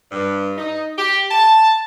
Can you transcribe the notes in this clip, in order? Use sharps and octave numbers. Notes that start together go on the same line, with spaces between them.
G2
D#4
G4
A5